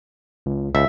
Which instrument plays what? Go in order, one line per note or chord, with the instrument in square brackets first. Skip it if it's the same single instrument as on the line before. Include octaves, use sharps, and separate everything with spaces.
[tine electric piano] C#2
[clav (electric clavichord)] C#2 [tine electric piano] E5